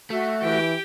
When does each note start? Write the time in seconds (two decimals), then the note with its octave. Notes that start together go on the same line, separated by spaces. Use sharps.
0.10 A3 F#4 E5
0.42 E3 G4 G5